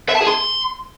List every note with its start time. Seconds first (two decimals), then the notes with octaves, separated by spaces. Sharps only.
0.09 E5
0.15 A5
0.21 G#4
0.27 C6